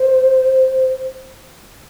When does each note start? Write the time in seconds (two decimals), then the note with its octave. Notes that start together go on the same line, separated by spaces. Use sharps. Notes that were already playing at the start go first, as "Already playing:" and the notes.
Already playing: C5